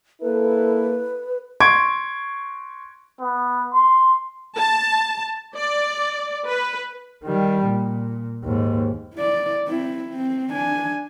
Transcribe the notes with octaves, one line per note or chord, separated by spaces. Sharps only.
A#3 E4 A4 B4
C6 C#6 G#6 D7
B3
C6
A5
D5
B4
D#3 G3
A#2
D#2 G#2
E4 D5
C4 E4
C4
D4 G#5